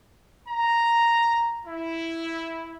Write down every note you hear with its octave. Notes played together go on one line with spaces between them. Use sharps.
A#5
E4